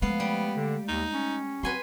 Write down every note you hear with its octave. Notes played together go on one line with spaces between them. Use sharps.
F3 G#3 A3 B3 F5
G3
D3
D#2 D#4
C#4
F#3 C4 B4 G#5 C6